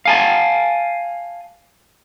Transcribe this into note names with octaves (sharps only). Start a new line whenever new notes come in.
F5 G#5 A5